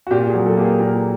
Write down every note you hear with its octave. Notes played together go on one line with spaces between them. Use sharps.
F#4
A#2 G4
G#4
F#3
A4
A#3 G4
G#4
A#2 A#4